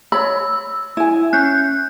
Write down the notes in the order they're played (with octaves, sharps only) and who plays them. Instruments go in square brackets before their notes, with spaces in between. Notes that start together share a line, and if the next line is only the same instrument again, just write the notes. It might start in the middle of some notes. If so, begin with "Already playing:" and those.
[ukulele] C#5 B5 [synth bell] E6
[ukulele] E4 G#5
[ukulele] C#4 [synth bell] F#6 G6